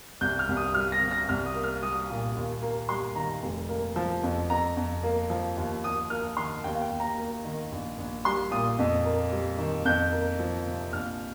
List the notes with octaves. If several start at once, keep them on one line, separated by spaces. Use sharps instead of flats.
C2 G6
F6
C2
D#6
G3 F6
A#6
C3
A#6
C2 F6
D#6
A#3
F6
G3 D#6
A#2
D#2
A#3
G3 C6
D#3 A#5
F1
A#3
F3
F2
F2 A#5
F2
A#3
F3
D#2
D#2 D#6
A#3 F6
D#3 C6
D#2 G5
F5
G5
D#2
A#5
A#3
D#3
A#1
A#1
G3 C6
A#2 D#6
F2
A#3
G3
D#3
F2 G6
A#3
F3
C3
A#1 F6